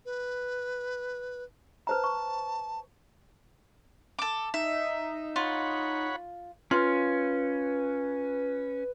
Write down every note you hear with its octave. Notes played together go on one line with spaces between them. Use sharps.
B4
B4 C5 A5 A#5
C#6
A4 D6
D#4 E5
F4 C#5 F#5 B5
C#4 F4 B4